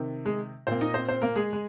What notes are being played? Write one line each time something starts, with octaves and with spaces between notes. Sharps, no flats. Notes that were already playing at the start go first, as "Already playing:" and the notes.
Already playing: C3 D#3
G#3 G#4
A#2 A#3 C4 C5
D#4 D#5
C4 C5
C4 C5
A#3 A#4
G#3 G#4
G#3